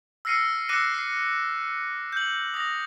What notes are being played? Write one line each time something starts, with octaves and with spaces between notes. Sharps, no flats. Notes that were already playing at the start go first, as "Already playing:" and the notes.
E6 F6 A#6 C7 C#7 D#7
D6 E6 F#6 A#6 C#7 D#7
C7
G6 F#7
D#6 A#6